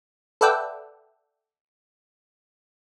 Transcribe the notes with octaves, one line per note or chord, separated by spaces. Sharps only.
A4 B4 D5 E5 F#5 G5